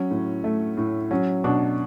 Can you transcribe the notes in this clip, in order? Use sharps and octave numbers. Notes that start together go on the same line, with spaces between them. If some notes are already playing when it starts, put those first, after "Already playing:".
Already playing: F#3 C#4
A2
A3
A2
F#3 C#4
B2 D4